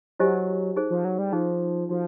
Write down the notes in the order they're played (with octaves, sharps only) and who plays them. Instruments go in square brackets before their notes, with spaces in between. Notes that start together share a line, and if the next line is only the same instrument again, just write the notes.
[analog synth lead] F#3 [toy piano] E4 G4 C5 D#5 G#5
[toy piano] D#4 G#4 C5
[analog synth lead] F3
F#3
G3
[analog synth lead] F3 [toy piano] D#4 G#4 C5
[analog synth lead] F3 [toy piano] D#4 F#4 A4